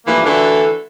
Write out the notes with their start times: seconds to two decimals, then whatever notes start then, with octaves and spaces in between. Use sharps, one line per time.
0.06 G2 E3 F3 A3 A#3
0.26 D3 E3 A3 D4 F#4 A4